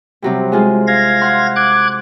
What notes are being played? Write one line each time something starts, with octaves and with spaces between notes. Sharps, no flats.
C3 F#3 G3
G#3 F4 G#4
F5 G#6 A#6
F#5 C6
D6 F#6 G#6